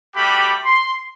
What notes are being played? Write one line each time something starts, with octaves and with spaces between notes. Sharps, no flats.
G3 A3 F#4 G4 B5
C6